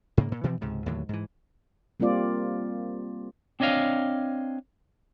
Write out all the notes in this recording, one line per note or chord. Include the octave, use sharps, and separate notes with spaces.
G#2 C#3 A#3
A#2
B2 E3 F3 C4
C#2 G#2 C3
D#2 A2 D3 F#3
G#2 E3
G3 A#3 C4 F4 D5
C4 D4 C#5 D#5 F5